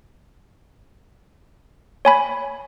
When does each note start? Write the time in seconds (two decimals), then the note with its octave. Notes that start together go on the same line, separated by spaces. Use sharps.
2.05 C#5 G#5 B5